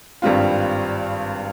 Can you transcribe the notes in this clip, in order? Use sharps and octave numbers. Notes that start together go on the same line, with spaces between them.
G#1 G2 G3 C4 F4